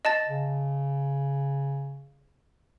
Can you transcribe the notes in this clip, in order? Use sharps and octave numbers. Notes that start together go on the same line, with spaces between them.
D#5 A5 A6
C#3